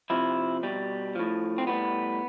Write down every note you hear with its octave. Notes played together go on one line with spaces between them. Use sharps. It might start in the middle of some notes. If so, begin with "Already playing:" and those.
C3 F3 E4
B2 G3
A2 F3
C4
A2 G3 B3